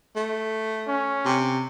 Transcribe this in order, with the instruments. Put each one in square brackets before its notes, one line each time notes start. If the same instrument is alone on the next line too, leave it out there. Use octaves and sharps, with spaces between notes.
[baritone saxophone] A3
[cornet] C#4
[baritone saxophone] C3